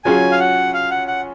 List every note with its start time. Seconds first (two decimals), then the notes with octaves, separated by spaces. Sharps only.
0.05 F#3 C#4 F4 G#4 G#5
0.32 F5
0.40 F#5
0.74 F5
0.91 F#5
1.08 F#5